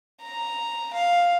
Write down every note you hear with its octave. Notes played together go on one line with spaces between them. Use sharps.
A#5
F5